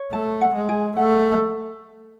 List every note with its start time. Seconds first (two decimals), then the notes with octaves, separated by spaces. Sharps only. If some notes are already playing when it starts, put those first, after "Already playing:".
Already playing: C#5
0.12 A3 A5
0.41 F#5
0.54 G#3
0.69 G#4
0.96 A3 F#5